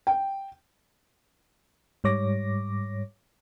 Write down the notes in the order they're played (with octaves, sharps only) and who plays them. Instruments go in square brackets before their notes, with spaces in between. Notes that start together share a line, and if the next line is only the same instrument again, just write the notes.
[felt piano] G5
[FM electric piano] G#2 G3 C#5 D6 A#6